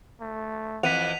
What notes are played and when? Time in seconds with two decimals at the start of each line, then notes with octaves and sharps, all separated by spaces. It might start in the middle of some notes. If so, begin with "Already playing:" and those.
0.21 A3
0.83 F2 E3 F#5 B6 D#7 F7